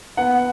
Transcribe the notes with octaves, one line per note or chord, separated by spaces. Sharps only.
B3 F#5